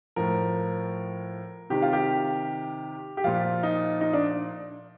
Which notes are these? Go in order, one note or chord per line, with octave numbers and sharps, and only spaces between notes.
A2 F3 A#4
C3 D#3 G4
F4
G4
G4
A#2 F3 F4
D#4
D#4
D4